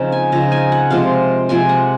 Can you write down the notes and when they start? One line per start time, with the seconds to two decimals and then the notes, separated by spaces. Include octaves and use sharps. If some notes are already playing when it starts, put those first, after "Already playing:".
Already playing: C#3 F3 C4 D#4
0.12 G#5
0.32 C#3 F3 C4 D#4 A#5
0.52 G#5
0.72 F#5
0.90 C3 F3 G#3 C4 F5
1.49 C3 F3 G#3 C4 G#5
1.69 F#5